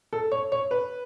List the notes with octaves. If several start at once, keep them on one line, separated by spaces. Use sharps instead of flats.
A4
C#5
C#5
B4